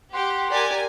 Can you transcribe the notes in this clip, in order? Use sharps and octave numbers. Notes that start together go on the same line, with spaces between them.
G4 F#5 C6
G4 A#4 D5 G#5